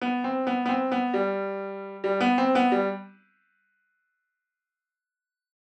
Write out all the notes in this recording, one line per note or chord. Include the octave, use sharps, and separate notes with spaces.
B3
C4
B3
B3
C4
B3
G3
G3
B3
C4
B3
G3